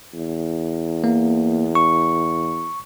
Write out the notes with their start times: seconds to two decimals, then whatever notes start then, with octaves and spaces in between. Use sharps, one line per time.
0.14 E2
1.04 A#3
1.75 C#6